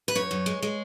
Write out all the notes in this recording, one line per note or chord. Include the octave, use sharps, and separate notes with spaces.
B4
F#2 C#5
F#2
G#3
G#3